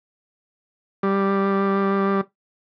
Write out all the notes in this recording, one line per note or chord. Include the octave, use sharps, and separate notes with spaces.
G3